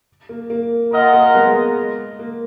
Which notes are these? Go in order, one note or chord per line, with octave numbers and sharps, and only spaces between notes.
A#3
A#3
A#3 F4 A#4 D#5 F#5
A#3
G#3 B3
A#3